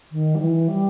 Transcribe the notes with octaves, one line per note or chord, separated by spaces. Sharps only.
D#3
G3
E3
G3